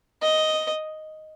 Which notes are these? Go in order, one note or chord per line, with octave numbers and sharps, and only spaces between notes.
D#5